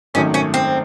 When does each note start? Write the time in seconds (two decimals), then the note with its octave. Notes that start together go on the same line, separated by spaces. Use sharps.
0.14 G#1 F#2 D#3 F#3 A3 C#4
0.34 C#4
0.54 C4